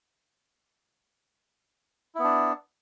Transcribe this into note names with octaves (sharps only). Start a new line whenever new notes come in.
B3 D4 E4